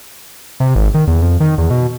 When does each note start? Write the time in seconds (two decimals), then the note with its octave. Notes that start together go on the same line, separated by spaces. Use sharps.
0.60 C3
0.76 G#1
0.94 D#3
1.07 E2
1.22 F2
1.40 D#3
1.58 E2
1.70 B2